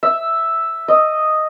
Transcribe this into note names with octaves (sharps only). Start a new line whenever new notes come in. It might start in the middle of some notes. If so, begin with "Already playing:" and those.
E5
D#5